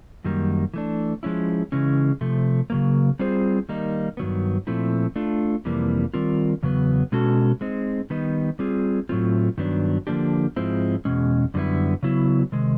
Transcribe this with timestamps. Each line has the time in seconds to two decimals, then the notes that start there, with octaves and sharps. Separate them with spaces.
0.24 F#2 D#3 G3 A#3
0.74 E3 A3 D4
1.23 F3 G#3 C#4 E4
1.72 C#3 E3 G#3 C#4
2.21 C3 F3 A3
2.70 C#3 F#3 A#3
3.19 G3 C4 F4 G#4 C5
3.69 D#3 G3 A#3 D#4
4.17 G2 D#3 F#3 B3
4.67 A#2 F3 A3 C4 E4
5.16 A3 D4 F4
5.65 F2 C3 E3 G3 A#3
6.14 D#3 G3 C4 F4 A#4
6.63 E2 C#3 F#3 B3
7.12 B2 G#3 C#4 F#4 A4
7.61 G#3 C4 D#4
8.10 D#3 G3 B3 D#4
8.59 G3 C4 F4 G#4
9.09 A2 F#3 A3 C4 F4
9.58 G2 D#3 F#3 B3 D4
10.07 D3 F3 A#3 D4 G4
10.56 G#2 F3 G#3 C4 E4
11.05 E2 B2 G#3 C#4
11.54 F#2 D3 G3 B3 E4
12.03 C#3 F#3 B3 E4
12.52 C3 D#3 G#3